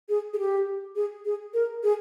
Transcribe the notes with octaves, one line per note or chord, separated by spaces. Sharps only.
G#4
G#4
G4
G#4
G#4
A#4
G#4